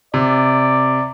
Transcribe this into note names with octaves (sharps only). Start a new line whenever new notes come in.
C3 D5